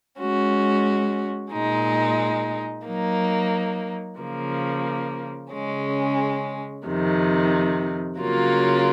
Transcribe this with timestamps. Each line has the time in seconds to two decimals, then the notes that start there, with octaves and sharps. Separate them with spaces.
0.19 G#3 C#4 F#4
1.52 A#2 G#3 D#4
2.85 F#3 A#3 D#4
4.19 C#3 F3 A#3
5.52 C#3 G#3 C#4
6.86 F2 C3 D#3
8.19 C#3 F#3 A#3 F4